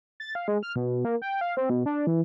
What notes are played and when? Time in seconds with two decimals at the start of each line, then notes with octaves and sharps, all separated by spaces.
0.20 A6
0.35 F5
0.48 G#3
0.63 F6
0.76 B2
1.05 A#3
1.22 G5
1.41 F5
1.57 C4
1.70 B2
1.86 D4
2.07 E3